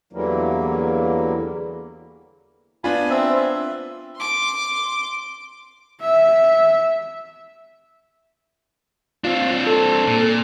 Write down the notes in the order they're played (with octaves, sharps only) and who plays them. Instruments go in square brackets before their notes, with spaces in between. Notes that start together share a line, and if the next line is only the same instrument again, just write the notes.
[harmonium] E2 D3 E3 F#3 G3 A#3
[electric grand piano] B3 D4 F4 [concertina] G#5 B5
[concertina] C4 E5
E5
[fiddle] C6 D6
[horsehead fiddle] E5
[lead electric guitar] C4 D4 [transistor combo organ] F4
[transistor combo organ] A4
[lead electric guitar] A#2